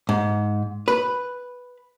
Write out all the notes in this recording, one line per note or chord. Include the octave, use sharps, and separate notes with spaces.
G#2
B4